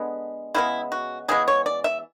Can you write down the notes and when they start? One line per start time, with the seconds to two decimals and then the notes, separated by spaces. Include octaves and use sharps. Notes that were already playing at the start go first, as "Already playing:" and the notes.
Already playing: D3 G#3 B3
0.54 C#3 E3 G#3 B3 E4
0.92 F#4
1.28 C#3 E3 G#3 B3 G#4
1.48 C#5
1.66 D5
1.84 E5